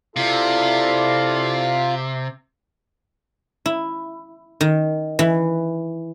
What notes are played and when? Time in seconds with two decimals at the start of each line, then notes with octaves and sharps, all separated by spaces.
0.16 C3 E4 F4 A4 D5 F5
3.66 E4
4.61 D#3
5.19 E3